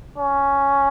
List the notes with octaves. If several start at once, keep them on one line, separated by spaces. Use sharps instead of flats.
C#4